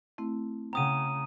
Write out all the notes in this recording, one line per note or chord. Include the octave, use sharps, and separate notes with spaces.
A3 C4 E4
C#3 F#5 G5 A#5 D#6 D#7